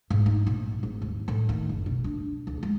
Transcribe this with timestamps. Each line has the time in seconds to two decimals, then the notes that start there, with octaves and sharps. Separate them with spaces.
0.10 G#2
0.26 D#4
0.47 A#1
0.83 G#1
1.02 D#2
1.28 A2
1.49 D#3
1.69 F#1
1.86 B1
2.04 D4
2.47 D2
2.63 G#3